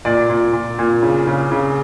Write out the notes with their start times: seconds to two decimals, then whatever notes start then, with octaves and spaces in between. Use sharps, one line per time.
0.05 A#2 D5
0.30 A#2
0.53 A#2
0.79 A#2
1.03 C#3
1.27 C#3
1.52 C#3